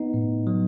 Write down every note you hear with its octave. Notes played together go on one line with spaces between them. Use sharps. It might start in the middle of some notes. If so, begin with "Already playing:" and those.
Already playing: B3 D#4
A2
F#3